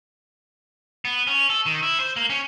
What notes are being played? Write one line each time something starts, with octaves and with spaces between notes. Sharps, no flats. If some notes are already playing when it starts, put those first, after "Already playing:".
B3
C#4
A4
D#3
E4
C5
A#3
C#4